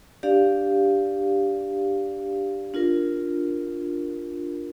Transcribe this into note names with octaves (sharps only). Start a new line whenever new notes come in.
D4 G4 D5 F5
D4 F4 A#4